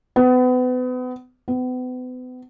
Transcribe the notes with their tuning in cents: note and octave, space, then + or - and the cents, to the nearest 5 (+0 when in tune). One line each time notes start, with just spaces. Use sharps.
B3 +35
B3 +40